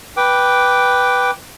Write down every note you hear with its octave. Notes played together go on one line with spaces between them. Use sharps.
B4 G5 D6